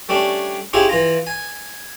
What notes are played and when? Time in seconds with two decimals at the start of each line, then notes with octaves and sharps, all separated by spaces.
0.09 G3 A3 C#4 D4
0.73 C#4 E4 F4 G4 G#4
0.89 E3 F4 A#5
1.27 G#5